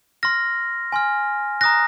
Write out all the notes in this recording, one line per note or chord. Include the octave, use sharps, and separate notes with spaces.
C6 F6 A#6
G#5 C6 F6
A#5 D#6 F#6 A#6